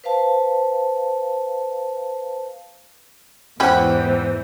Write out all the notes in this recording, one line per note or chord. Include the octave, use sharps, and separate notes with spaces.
B4 C5 F5 A5
E2 G#2 E3 C#4 E4 G4 C5 F#5